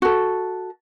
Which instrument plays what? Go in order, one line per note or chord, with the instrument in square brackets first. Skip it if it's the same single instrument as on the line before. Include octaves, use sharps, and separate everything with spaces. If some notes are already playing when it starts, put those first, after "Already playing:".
[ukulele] F#4 A4